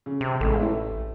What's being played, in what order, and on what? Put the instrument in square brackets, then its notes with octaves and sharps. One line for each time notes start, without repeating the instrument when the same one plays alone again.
[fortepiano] C#3
[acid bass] C3
[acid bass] A1 [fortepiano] G#3 A4
[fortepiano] A2 A3